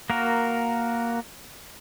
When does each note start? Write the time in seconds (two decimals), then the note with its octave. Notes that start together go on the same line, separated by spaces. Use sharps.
0.10 A#3 F#4 A#4